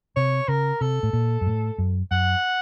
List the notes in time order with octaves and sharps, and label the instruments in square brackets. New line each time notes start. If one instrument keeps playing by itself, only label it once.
[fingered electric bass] C3 [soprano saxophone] C#5
[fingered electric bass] C#3 [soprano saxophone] A#4
[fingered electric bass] C3 [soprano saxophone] A4
[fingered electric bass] A2
A#2
F#2
A2
F#2
[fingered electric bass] F#2 [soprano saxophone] F#5